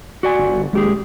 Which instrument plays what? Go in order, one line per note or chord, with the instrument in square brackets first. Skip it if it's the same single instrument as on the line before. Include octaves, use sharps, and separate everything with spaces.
[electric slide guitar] F#4 D5 G#5
[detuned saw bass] G1
[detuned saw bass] D#1 [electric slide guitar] G#3 G4 G#4